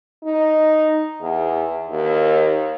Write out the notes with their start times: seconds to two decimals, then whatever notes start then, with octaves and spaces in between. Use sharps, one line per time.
0.24 D#4
1.21 E2
1.90 D#2